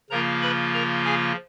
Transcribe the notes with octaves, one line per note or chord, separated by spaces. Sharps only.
C#3 F3 A#3 F4 A#4 A#5
B4 B5
A#4 A#5
G#4 G#5